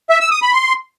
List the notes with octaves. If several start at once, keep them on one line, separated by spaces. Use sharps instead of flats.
E5
E6
D#6
B5
C6